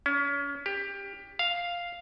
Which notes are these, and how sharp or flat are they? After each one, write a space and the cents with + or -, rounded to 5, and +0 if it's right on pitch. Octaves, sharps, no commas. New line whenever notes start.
C#4 +35
G4 +20
F5 +0